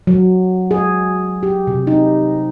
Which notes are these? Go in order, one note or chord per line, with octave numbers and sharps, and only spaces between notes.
F#3
G#4
G4
C3
D#4